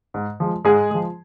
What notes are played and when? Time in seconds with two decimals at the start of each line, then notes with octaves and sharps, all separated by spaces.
0.14 G#2
0.40 F3 G#3
0.65 G#2 G#3 G#4
0.91 F3 G#3